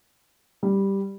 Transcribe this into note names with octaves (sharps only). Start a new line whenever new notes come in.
G3